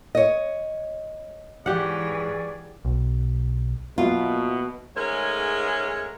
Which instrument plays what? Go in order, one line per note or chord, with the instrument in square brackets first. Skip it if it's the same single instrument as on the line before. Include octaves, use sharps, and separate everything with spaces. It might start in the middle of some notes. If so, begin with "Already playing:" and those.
[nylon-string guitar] C#5 D#5
[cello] G#2 E3 [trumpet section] C#4 G#4 D5 [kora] G4 F#5
[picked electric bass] B1
[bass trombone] B2 [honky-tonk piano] F#3 A#3 E5 [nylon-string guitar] F4
[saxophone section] G#2 G#3 A3 C#4 A#4 C#5